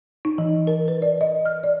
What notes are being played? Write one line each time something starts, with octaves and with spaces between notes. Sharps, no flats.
D#4
E3
A#4
B4
D5
D#5
F6
D5